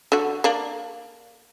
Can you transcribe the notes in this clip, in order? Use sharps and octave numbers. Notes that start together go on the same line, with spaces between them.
D3 F#4
A#3 D4